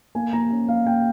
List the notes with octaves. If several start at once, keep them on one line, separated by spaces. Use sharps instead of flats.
A#3 G#5
A#3 A#5
C#4
A#3 F5
A#3 G5